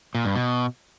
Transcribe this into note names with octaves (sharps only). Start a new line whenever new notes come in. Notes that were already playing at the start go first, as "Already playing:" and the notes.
A#2
G2
B2